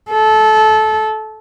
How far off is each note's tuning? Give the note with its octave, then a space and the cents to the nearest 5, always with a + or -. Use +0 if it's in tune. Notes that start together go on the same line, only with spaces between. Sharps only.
A4 -20